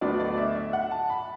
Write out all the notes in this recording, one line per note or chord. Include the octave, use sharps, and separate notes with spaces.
D2 D3 F#3 B3 D5
D5
E5
E5
F#5
A5
B5